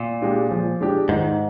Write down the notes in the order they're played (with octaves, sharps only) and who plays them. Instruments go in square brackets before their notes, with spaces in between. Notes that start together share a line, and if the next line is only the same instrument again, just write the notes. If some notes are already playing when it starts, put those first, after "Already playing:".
Already playing: [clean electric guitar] A#2
[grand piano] G#3 D4 G4
F3
G#3 D4 G4
[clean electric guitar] G#2 [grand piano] D#3